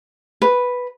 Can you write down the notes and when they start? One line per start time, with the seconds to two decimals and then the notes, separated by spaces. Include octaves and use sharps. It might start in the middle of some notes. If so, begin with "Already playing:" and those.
0.42 B4